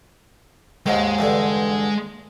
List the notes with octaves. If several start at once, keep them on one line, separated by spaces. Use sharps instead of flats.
D#2 G#2 D#3 G#3
E2 G2 D3